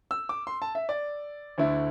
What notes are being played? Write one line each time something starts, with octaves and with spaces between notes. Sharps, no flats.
E6
D6
C6
A5
E5
D5
D2 D3 A3 E4